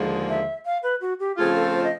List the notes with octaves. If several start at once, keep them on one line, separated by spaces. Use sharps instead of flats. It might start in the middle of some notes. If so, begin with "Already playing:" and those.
Already playing: D#2 D3 F3 G#3
E5
F5
B4
F#4
G4
C#3 F3 A3 C4 F4 G#4
A4
C5
D#5